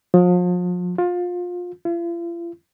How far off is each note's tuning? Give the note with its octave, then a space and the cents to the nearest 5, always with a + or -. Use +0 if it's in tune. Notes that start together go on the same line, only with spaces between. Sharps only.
F3 +40
F4 +25
F4 -45